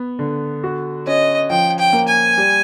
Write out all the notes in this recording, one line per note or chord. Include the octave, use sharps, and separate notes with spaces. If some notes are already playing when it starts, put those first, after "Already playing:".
Already playing: B3
D3
F#4
C#4 D#5
F3 G5
G5
A#3
G#5
G3